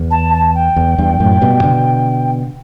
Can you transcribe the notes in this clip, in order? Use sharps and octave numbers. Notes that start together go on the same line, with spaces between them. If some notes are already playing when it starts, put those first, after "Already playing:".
Already playing: E2
A5
A5
G5
E2
E2 G2
F#2 A2
G2 B2
B2 D3